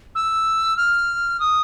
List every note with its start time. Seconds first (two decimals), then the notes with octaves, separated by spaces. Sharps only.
0.15 E6
0.77 F6
1.40 D#6